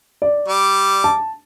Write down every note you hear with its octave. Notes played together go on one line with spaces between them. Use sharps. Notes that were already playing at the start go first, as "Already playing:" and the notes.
D5
G3 D6
A5